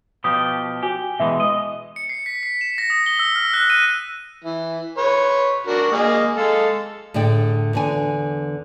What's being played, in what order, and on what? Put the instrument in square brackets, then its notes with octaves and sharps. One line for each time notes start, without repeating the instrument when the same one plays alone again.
[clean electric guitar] B2 F3 G4 [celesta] D#6
[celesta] F#4 G#5 [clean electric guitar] G4
[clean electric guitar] B2 E3 G#3 [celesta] E5
[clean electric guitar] D#5
[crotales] C#7
C7
B6
C7
E7
A#6
D#6
G7
E6
F6
F#6
D#7
[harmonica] E3
B4 C#5
D4 F#4 A#4
A#3 G#4 D#5
G#3 A4 F5
[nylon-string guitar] A2 D3 G#4 D5 G5
E2 D3 G#5